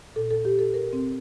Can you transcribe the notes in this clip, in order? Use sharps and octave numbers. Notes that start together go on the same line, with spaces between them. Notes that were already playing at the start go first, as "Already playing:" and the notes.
A#2 A4
A4
G4
A4
A#4
C4